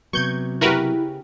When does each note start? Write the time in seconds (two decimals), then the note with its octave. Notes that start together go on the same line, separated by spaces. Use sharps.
0.13 C3 F#3 B3 C#6 G6 G#6
0.61 C#3 E4 F#4 G4 A#4 B4